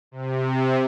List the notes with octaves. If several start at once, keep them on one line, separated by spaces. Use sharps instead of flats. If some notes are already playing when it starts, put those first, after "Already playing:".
C3